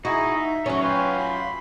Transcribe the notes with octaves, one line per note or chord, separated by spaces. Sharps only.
D#4 E4 F#4 G#4 D#5
E5
F#3 A3 C#4 F#4 C#5
F4 G4 B4 F5 G#5
B5 C6